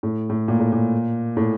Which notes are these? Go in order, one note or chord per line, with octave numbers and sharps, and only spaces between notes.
A2
A2
A#2
A2
A#2
A2